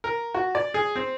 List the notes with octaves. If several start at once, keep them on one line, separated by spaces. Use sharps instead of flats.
A#4
F#4
D5
G#4
C4